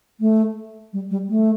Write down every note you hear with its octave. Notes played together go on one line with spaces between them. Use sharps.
A3
G3
G3
A3